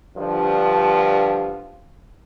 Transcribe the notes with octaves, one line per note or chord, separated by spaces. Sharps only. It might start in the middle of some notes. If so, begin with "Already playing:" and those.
G2 D3 F3